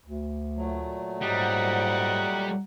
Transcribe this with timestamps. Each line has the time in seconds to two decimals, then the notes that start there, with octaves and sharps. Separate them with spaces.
0.06 D2
0.56 A#2 F#3 A3
1.21 G#2 G3 D#5 F#5 A#5